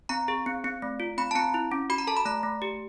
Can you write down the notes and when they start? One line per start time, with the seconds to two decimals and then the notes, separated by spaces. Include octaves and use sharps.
0.09 C4 A#5
0.28 G#4
0.46 C4
0.64 C4
0.82 A3
1.00 F4
1.18 C4 B5
1.31 A5
1.35 C4 A#5
1.54 E4
1.72 C#4
1.90 F#4 B5
1.98 A#5
2.07 A4 A5
2.17 B5
2.25 A3 A#5
2.43 A3
2.62 G4